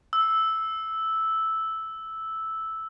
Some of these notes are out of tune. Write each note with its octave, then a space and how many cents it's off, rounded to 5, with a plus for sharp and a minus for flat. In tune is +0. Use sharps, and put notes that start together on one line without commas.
E6 -5